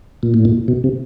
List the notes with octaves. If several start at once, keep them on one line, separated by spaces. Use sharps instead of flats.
A#2
A2
A#2
B2
C3